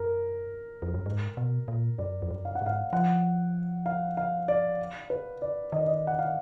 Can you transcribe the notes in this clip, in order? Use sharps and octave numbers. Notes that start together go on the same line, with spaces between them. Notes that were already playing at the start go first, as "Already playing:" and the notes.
Already playing: F#2 A#4
F2
F#2
G#2
B2
A#2
F#2 D5
F2
F#2
F5
F#5
G#2 F5
F3 F#5
F5
F5
D5
B4
D5
D#3 D#5
D5
D#5
F#5
F5